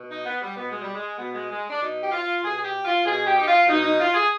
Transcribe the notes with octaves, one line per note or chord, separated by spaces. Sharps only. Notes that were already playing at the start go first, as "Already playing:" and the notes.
Already playing: B2
D#4
B3
G3
B2 B3
G#3
G3
G#3
B2 B3
G#3
G#3
D4
B2 D#4
G4
F4
B2 G#4
G#4
G4
F4
B2 G#4
G4
D#4
F4
B2 D#4
D#4
F4
G#4